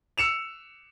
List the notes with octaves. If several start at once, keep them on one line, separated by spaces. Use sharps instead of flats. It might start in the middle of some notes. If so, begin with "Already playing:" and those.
E6 C#7 E7 F7